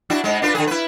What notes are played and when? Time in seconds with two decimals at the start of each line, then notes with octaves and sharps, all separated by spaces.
0.10 D4 E4 F#4
0.24 G#2 G#3
0.42 D4 F4 B4
0.55 D3 G#4
0.67 E4 B4